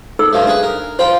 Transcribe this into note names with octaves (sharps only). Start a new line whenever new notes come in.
D#4 A4 E6
G2 F3 A3
D4 G#4 B4
A#4
F4 C5 G5